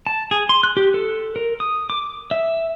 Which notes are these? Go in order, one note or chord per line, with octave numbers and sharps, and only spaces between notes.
A5
G#4
C6
F#6
G4
A4
A#4
D#6
D6
E5